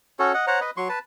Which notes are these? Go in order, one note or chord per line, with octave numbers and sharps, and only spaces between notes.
C#4 F#4 A4 C#5
D#5 F#5
C5 C#5 F#5 A#5
B4 D#5
F#3 C6 C#6
B4 A5